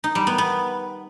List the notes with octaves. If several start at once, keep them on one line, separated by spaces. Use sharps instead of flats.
D#4
G3
B3
B3